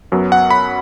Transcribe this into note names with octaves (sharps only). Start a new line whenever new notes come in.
F#2 F#3 B3
F#5
B5